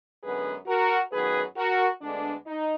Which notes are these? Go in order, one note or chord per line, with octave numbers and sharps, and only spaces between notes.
F#2 D3 G#3 B3 G#4 B4
F#4 A#4
F#2 D#3 F#3 B3 G#4 B4
F#4 A#4
D2 D3 G#3 B3 D4
D#4